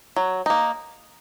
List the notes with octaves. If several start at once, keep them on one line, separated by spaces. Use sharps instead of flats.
F#3
A#3 D#4